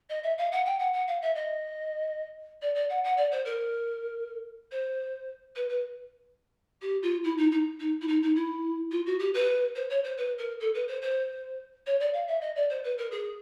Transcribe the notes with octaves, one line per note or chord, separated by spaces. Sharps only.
D#5
E5
F5
F#5
G5
F#5
F#5
F5
E5
D#5
D5
D5
F#5
F#5
D5
C5
A#4
C5
B4
B4
G4
F4
E4
D#4
D#4
D#4
E4
D#4
D#4
E4
F4
F#4
G4
B4
C5
C#5
C5
B4
A#4
A4
B4
C5
C5
C#5
D5
F5
E5
D#5
D5
C5
B4
A#4
G#4